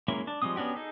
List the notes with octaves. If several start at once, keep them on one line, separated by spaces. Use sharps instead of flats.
F#3 G#3 A#3 C#4 E4
D4 A5
F3 G3 G#3 C4 D#6
B3 C#4 D4 F#4 G4
D#4 G#4 A4